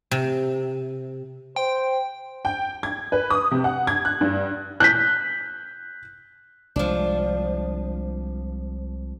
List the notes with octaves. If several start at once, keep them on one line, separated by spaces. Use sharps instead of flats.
C3
C5 G5
G5
G#6
B4
D#6
C3
F#5
G#6
F#6
G2
F#6 G6 B6
C2 F3 G#3 D4